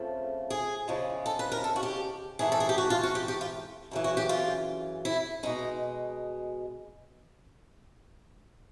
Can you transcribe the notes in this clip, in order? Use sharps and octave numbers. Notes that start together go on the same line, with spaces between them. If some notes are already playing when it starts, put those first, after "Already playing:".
Already playing: F2 C#3 F3 A3
G#4
E2 C#3 F3 G#3
A4
B4
A#4
A4
F#4
G4
G#2 E3 A3 G#4
A4
G#4
G4
F#4
F4
F#4
G4
G4
F4
F#2 C#3 E3
F#4
G4
F4
E4
B2 G#3 D#4